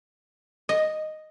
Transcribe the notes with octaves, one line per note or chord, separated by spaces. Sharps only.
D#5